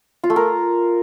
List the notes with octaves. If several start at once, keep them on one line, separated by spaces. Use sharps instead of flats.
F4
A3
A#4